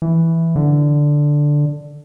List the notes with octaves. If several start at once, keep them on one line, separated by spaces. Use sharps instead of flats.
E3
D3